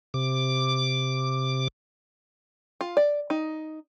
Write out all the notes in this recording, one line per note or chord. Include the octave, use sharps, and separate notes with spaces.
C3 D6
F4
D5
D#4